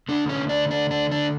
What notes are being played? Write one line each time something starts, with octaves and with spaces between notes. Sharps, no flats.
D3 A3 D4
C#4
D4
D4
D4
D4